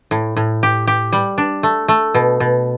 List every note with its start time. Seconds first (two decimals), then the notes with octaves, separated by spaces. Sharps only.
0.11 A2
0.37 A2
0.63 G4
0.87 G4
1.13 G3
1.38 D4
1.63 A3
1.88 A3
2.15 B2
2.40 B2